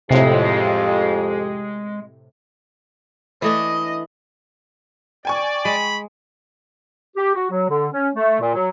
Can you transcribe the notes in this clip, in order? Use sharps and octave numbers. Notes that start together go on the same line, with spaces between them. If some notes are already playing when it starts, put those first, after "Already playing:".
F2 A2 C3 G#3 G4
E3 A3 D4 D#5
D5 G5 G#5 C#6
G#3 B5
G4
F#4
F#3
D3
C#4
A3
A#2
F#3